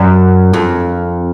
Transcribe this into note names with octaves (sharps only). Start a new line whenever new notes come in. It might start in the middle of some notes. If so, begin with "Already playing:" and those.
Already playing: F#2
F2